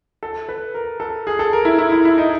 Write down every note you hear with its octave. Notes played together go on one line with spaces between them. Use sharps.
A4
B4
A#4
A4
G#4
A4
A#4
E4
E4
E4
E4
D#4